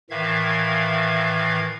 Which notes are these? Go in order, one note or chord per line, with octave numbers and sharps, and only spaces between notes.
A2 D#3 E3 E5 F5 G#6